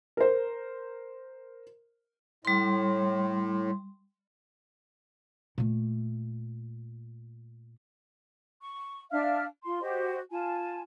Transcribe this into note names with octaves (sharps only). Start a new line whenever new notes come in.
A#4 C5
A2 G3 C6
A#2 A3
C#6
D4 E5 F5 F6
F4 C6
F#4 G4 C5 D#5
F4 G#5 A5